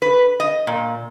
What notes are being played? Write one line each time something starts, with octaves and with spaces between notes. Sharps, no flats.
B4
D#5
A#2